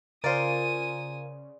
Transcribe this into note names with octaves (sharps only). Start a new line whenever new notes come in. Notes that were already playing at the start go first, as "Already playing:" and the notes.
C#3 F4 A#4 C5 D5 G#5 D#6